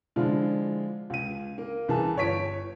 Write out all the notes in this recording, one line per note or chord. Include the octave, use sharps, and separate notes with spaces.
D3 F3 G#3 D4 E4 F4
C#2 D#7
A#3
C2 E3 G#4 A5
G1 C#5 C#6 B6 D7